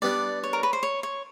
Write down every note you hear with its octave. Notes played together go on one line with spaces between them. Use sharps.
G3 B3 D4 D5
C#5
A#4
B4
C5
C#5
C#5